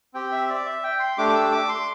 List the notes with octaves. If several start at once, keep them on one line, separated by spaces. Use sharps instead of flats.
C4 G4 G5
E5
D5
E5
G5
C6
A3 D4 G4 D6
D6
E6
D6
C6